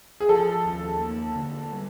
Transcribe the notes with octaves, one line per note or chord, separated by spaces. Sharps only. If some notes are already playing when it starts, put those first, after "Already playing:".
G#4
F3 A4
D#2
A#3
D3
G3